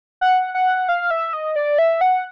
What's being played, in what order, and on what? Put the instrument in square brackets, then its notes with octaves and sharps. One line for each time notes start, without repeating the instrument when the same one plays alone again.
[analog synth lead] F#5
F#5
F5
E5
D#5
D5
E5
F#5